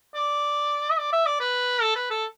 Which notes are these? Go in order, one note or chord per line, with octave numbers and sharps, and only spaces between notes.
D5
E5
D5
E5
D5
B4
A4
B4
A4